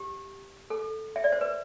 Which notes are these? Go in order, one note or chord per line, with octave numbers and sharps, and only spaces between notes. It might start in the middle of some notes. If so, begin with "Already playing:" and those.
Already playing: G4
A4
E5
D5
C5
B4